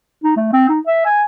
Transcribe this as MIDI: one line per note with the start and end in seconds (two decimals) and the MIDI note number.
0.24 0.34 63
0.37 0.52 57
0.53 0.66 60
0.69 0.80 63
0.87 1.01 76
1.06 1.23 80